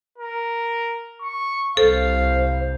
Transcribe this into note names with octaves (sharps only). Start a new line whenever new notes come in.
A#4
C#6
C2 A4 C5 F5